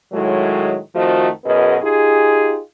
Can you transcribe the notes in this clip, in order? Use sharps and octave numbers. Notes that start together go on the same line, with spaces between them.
A2 D#3 F#3 G#3
F2 D#3 F3 A3 F#4 D#5
F#2 B2 B3 G#4 D#5
D#4 F4 G4 G#4